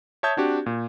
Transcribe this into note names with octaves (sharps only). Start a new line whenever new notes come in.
C#5 E5 A5 D#6 G6 G#6
C4 D4 F#4 G4
A#2